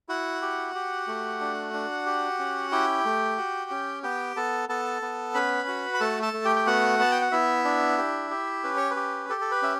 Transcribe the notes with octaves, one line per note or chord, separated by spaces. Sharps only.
E4 F#4 F#5
G4
G4
A3
D4
D4
G4
C#4
E4 G4 G5
A3
F#4
C#4
B3 G4 G5
B3 A4 A5
B3 A4 A5
B3
C#4 B4 B5
F#4
B5
A3 A4 A5
A4 A5
A3
G4 G5
G5
B3 F#4 F#5
B3 A5
G5
F#5
B3 E4 E5
D4
G4
G4
C#4 B4
C#5
B4
G4
G4 A4
A4
B4
C#4 E5